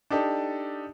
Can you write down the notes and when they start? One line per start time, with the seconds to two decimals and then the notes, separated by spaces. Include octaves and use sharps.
0.11 D4 D#4 G4 A4